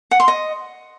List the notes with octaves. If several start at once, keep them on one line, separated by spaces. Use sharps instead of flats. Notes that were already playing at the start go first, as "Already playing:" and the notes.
F#5
C6
D#5